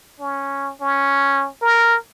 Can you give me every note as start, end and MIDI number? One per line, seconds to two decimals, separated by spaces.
0.20 0.73 61
0.81 1.48 61
1.62 1.97 70